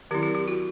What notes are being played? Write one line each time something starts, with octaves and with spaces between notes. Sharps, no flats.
D#3 F#3 C4 E4 G4
G4
G4
F#4